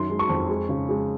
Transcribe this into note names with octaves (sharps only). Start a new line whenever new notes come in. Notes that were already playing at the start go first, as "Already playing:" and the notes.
Already playing: F#2 D#3 C6
G#3
C#6
F2
G#3
C#3
G#3